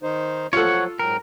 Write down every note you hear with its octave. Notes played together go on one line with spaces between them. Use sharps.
D#3 D#4 C5
F3 F#3 F4 A4 C#5 F#5
G#2 F#3 A#4 G5